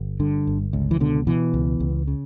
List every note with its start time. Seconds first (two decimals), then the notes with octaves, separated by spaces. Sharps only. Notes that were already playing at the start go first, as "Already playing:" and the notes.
Already playing: G1
0.20 G2 D3
0.47 G1
0.73 C#2
0.91 E3
1.00 B2 D3
1.27 B2 E3
1.54 C#2
1.80 C#2
2.07 C#3